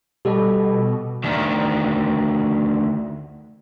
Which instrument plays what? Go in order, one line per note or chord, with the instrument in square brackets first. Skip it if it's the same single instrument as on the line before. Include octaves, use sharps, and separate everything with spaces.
[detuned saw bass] B2 [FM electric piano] G3 B5 [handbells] G4 A4 D#5
[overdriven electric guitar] D2 D#3